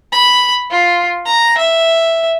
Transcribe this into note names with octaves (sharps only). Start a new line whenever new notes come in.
B5
F4
A#5
E5